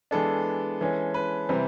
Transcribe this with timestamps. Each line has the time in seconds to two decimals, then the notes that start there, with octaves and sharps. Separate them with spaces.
0.11 E3 G#3 B3 D4 A4
0.81 E3 G#3 C#4
1.14 B4
1.49 C3 E3 G3 C4